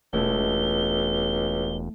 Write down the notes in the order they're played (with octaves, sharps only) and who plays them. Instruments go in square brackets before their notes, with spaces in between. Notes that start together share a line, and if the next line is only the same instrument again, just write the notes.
[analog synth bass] E1 [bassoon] C#2 [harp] A3 E4 [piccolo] G7